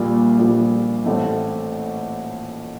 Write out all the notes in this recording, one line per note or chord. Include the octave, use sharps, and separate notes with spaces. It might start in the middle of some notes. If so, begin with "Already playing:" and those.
Already playing: A#1 A#2 G3
A#1 A#2 G3
A1 A2 A3 C4